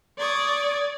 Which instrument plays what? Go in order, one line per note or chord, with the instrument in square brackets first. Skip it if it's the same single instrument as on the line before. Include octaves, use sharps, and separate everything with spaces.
[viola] D5 [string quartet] C#6 D#6 G#6